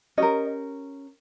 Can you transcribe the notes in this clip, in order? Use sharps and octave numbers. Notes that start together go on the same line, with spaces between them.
C#4 G4 A#4 D#5